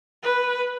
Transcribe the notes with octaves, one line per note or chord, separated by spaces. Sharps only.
B4